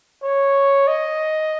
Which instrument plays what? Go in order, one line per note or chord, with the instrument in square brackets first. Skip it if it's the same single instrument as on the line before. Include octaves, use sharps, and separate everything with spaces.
[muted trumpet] C#5
D#5